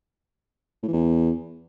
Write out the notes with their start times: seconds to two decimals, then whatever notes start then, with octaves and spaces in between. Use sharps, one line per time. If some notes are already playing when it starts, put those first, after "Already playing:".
0.83 A2
0.88 E3
0.93 E2